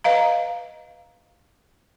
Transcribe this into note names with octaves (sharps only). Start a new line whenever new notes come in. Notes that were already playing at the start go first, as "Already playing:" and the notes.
B4 D#5 F5 A#5